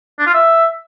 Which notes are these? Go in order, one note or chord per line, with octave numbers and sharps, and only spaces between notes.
D4
F4
E5